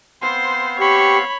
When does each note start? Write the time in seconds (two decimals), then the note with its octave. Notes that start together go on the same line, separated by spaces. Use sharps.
0.22 B3 C4 C5 F5 C6
0.80 G4 C#5 B5 C#6